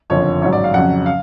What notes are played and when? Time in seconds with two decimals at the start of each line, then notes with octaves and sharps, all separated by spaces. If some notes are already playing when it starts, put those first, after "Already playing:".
0.10 F#1 F2 D3 F3 C#5
0.42 A1 G#2 F#3 C#5
0.53 D5
0.64 F5
0.74 F2 C#3 F#3 F#5
1.06 F5